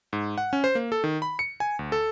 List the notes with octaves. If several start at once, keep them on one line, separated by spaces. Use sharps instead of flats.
G#2
F#5
C#4
C5
A#3
A4
D#3
B5
C#7
G#5
D2
A4